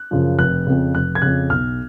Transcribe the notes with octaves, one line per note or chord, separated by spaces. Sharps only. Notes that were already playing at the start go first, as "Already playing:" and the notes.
Already playing: F#6
F#2 C#3 F3
F1 F#6
F2 C#3
F1 F#6
G#6
F2 C#3 F#6
B1 F6